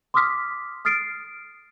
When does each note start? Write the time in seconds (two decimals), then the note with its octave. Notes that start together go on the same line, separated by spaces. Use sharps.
0.14 C6 D6 D#6 F6 B6
0.85 D#6 F6 A6 C7 D7